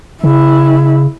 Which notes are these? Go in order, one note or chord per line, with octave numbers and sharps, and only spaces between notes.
C#3 E4